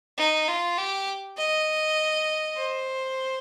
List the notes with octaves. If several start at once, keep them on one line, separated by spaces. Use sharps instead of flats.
D#4
F4
G4
D#5
C5